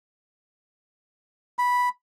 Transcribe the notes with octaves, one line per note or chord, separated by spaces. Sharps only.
B5